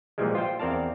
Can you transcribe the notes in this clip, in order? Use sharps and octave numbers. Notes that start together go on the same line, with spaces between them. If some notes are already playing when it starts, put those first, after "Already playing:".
A#2 E3 F3 G3 G#3
F4 C5 G5
E2 C4 A#4 D5 F5 A5